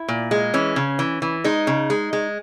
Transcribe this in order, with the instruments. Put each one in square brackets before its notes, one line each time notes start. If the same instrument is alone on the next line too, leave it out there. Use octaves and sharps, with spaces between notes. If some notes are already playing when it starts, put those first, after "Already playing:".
Already playing: [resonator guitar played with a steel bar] E4
A#2
G#3
E3 C#4
C#3
E3
E3
G#3 D#4
C#3
G#3
G#3